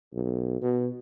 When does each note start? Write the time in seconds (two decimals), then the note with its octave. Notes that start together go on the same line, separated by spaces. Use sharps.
0.14 B1
0.62 B2